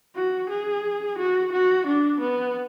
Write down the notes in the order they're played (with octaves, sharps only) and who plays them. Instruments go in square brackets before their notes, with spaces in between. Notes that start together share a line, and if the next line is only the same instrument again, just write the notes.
[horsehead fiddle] F#4
G#4
F#4
F#4
D4
B3